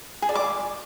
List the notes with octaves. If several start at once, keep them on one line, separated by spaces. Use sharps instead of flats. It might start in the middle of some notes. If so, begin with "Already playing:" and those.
G#4
D5
D6